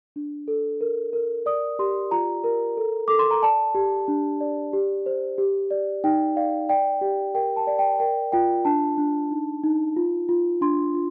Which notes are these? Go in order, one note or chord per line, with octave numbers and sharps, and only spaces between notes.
D4
A4
A#4
A#4
D5 D#6
G4 C6
F4 A#5
A#4
A4
A4 D6
C6
A#5
D5 A5
G4
D4
D5
G4
C5
G4
D5
D#4 G5
D5 F5
D5 G5
G4
A#4 G5
A5
D5
G5
A#4 G5
F4 G5
D4 A5
D4
D#4
D#4
F4
F4
D4 C6
F4